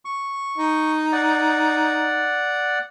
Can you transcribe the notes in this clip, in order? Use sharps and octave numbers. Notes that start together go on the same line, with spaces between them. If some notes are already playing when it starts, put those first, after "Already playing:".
C#6
D#4
D5 F#5